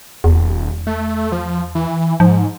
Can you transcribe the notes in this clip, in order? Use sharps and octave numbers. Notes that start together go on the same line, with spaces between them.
D#1 E2
A3
F3
E3
G#2 F3